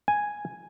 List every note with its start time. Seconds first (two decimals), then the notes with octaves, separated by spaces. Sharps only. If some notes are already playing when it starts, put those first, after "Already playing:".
0.08 G#5